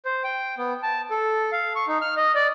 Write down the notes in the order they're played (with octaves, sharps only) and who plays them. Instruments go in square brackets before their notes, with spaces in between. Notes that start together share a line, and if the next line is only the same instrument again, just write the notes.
[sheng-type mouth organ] C5
G5
B3
A5
A4
F5
C#6
D#4
F6
D#5
D5